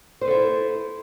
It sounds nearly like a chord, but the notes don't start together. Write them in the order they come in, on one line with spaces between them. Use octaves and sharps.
C5 B4 A4 E4